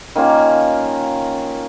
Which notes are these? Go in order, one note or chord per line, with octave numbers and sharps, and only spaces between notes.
D#3 A#3 C#4 F4